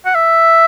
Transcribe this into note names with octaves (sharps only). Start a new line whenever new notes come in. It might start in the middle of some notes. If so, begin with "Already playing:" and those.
F#5
E5